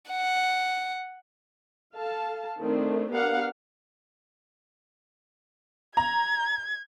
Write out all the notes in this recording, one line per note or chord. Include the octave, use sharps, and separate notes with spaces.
F#5
A4 F5 A5
D#3 A3 C4 D4
B3 D4 G4 A#4 F5 F#5
A#5 G#6